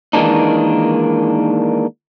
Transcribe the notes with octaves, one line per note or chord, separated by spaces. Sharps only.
D#3 E3 G#3 A#3 D4 D#4